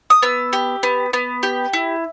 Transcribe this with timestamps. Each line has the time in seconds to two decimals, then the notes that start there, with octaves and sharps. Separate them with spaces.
0.10 D#6
0.22 B3 E6
0.53 G4
0.83 B3
1.13 B3
1.43 G4
1.73 E4